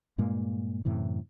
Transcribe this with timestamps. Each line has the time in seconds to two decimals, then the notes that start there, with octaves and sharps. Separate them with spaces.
0.18 G2 A#2 G#3 A#3
0.85 F#2 A2 C3 E3